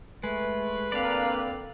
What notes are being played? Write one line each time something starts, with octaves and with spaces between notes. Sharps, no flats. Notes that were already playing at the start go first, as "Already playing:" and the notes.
G#3 A3 B4
D3 A#3 C4 D4 D5 F5